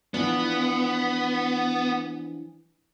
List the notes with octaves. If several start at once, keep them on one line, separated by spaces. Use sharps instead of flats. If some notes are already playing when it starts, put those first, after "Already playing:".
E3 F3 B3 D4